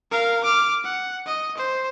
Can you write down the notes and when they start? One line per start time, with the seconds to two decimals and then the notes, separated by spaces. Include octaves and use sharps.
0.11 A#4 F5
0.44 D6 F6
0.84 F#5
1.26 D#5
1.57 C5